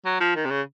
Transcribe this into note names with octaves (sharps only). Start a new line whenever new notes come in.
F#3
F3
D#3
C3
C#3